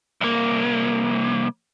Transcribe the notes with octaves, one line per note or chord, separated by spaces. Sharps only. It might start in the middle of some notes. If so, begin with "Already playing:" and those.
C2 A#3